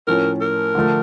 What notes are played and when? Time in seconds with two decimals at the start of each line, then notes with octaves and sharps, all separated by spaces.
0.07 A2 F3 C#4 A#4
0.41 A#4
0.75 D3 F3 A3